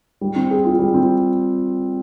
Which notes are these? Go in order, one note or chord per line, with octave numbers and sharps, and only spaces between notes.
G3
C4
G#4
F4
G3
C4